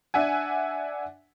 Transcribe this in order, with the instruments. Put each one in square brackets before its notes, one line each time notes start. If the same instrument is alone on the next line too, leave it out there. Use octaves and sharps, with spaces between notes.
[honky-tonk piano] D4 E5 F#5 G#5